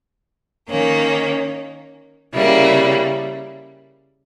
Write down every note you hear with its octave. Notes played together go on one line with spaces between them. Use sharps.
D#3 A#3 C#4
C#3 G3 A#3 E4